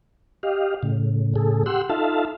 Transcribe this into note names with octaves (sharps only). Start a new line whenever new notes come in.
G4 D#5 F5
A2 C#3
A2 C#3 G#4 A4
G4 F#5 C6 E6
D#4 F4 A4 E5 F5 A5